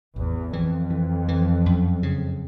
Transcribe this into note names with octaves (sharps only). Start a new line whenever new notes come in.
A1 E2
F2 E3
E3
E3
F#2
C#3